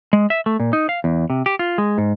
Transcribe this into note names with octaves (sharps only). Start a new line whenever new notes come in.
G#3
E5
A3
A#2
D#4
F5
E2
C3
G4
F4
G#3
G#2